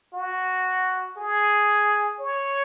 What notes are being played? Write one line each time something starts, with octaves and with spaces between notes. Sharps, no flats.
F#4
G#4
C#5